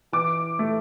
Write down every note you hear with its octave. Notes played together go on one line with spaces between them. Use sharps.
E3 D6
A3